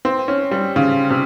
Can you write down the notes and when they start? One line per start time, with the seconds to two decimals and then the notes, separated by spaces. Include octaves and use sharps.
0.05 C4
0.28 C#4
0.51 G3
0.76 C#3
1.10 C3